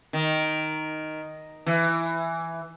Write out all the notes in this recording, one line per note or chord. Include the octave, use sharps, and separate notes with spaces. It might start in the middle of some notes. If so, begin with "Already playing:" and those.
D#3
E3